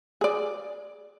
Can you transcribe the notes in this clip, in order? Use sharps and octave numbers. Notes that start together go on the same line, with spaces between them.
G#4 D5